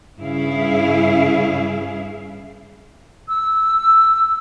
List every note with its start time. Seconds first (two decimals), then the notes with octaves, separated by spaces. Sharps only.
0.19 G2 C#3 E4 G#4 F5
3.29 E6